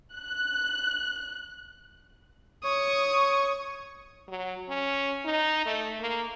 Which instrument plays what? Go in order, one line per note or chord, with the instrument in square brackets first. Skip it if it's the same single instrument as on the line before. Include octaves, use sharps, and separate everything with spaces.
[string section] F#6
[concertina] C#5 [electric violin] C#6 D#6
[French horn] F#3
C#4
D#4
A3
A#3